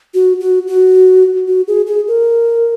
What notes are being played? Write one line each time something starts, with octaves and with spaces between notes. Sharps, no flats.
F#4
F#4
F#4
F#4
G#4
G#4
A#4